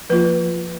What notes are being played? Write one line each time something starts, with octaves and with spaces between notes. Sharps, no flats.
F3 A#3 F4 B4